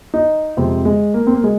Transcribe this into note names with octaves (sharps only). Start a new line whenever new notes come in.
D#4
F2 C3 F3 G#3 C4
G#3
A#3
C4
A#3
G#3